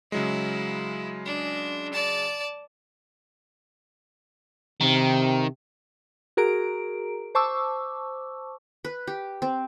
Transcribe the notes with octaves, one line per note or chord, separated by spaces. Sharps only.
C#3 F#3 G#3 E4
D4
D5 A5
C3 D#3
F#4 G#4 A#4 A#5 D7
C5 A5 C#6 D6 E6
B4
G4
C4